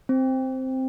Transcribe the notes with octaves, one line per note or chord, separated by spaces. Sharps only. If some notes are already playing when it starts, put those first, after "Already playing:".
C4